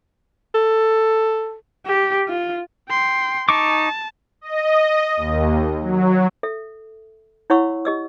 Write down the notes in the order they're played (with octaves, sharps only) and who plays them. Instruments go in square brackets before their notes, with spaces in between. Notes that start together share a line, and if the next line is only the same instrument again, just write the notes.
[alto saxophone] A4
[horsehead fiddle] G4
F4
[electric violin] G5 C6
[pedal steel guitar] D#4 C#6 D6 [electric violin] A5
[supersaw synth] D#5
D#2
F#3
[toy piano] A4 E5
E4 C#5 F#5 B5 C#6 E6
G4 D#5 E6